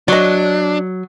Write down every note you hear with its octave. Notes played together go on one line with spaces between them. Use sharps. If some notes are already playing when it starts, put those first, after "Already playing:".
F#3 D4 D5 D#5